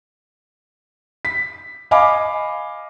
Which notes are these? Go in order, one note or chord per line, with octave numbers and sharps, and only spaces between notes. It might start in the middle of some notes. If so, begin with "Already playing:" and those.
B6
D#5 F5 G#5 B5 D6